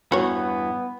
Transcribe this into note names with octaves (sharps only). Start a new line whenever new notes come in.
E2 G2 E3 B3 F#4 C#5